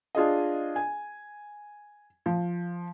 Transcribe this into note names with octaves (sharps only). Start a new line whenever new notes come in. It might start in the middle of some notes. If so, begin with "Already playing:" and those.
D4 F4 G#4 D#5
G#5
F3